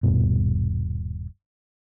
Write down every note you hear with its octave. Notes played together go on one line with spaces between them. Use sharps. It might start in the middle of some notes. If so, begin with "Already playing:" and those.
D#1 G2 B2